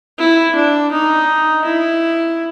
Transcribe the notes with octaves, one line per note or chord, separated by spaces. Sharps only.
E4
D4
D#4
E4